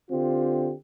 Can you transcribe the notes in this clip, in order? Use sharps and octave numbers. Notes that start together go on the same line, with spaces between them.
D3 C4 F4 G4